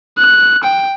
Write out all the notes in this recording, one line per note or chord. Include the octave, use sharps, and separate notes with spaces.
F#6
G5